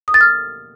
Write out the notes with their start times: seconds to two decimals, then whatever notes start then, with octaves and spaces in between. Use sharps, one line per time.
0.08 D#6
0.14 A6
0.21 F6